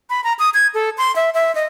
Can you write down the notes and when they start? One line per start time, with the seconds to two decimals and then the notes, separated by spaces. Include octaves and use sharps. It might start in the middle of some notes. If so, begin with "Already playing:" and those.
0.10 B5
0.24 A#5
0.39 D#6
0.54 G#6
0.74 A4
0.98 C6
1.16 E5
1.34 E5
1.55 D#5